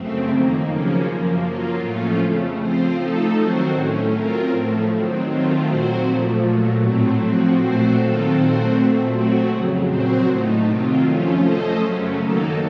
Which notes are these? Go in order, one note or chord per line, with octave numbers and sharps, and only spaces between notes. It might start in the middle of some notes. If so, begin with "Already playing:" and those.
Already playing: F#2 C#3 A3 C4
F2 D#3 A#3
F#2 C#3 F3 A#3 C#4
F#2 F3 A#3
F#3 A#3 F4
A2 F3 A3 C#4 F4
F2 C#3 A3
F3 C4 F4 C5
F3 A3 D#4 A4
D#3 F#3 C4 F#4 C5
A2 A3 C#4
F#3 C4 F4 A#4
A2 F3 A3
D#3 F#3 C4
D#3 F#3 A3 C4 F4
A#2 F#3 C4 F#4 C5
A#2 F3 A3
A#2 F#3 A3
A2 F#3 A3 C4
A2 F3 C4 F#4
A#2 A3 C4 F#4 C5
D#3 F#3 C4 F4 A4
A#2 A3 C4 F#4 C5
A#2 A3 C4
F#3 A3 C4 F#4
F2 C#3 F#3
A#2 F#3 C4 F#4 C5
A2 A3 D#4
C3 D#3 F#3 C4 F4
F#2 F3 A3 C#4 F4
A3 C#4 A4 C5 D#5
F#2 C#3 F#3 A3 C#4
D#3 F#3 A#3 D#4 A4